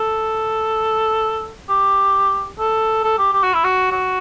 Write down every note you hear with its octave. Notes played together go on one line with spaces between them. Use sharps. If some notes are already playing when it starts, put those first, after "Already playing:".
Already playing: A4
G4
A4
A4
G4
G4
F#4
E4
F#4
F#4